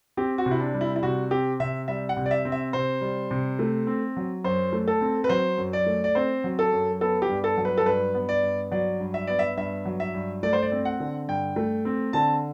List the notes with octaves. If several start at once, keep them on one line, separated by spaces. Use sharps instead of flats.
C4 G4
F#4
C3
E4
D4
G3
E4
E4
C3 F#4
C4 G4
C3 E5
G3 E5
F#5
C3
D5
E5
C4
E5
C3 C5
G3
C3
A3
C4
F#3
F#2 C5
A3
A4
C4
B4
F#3 C5
F#2
D5
A3
D5
C4 C5
F#3
A4
F#2
B3 A4
G4
G2
A4
F#3
B4
A4
G2 B4
B3
D5
G2
F#3 D5
G2
E5
B3 D5
E5
G2 E5
F#3
E5
G2
A3 D5
C5
D5
C4
F#5
D3
G2 G5
A3
C4
D3 A5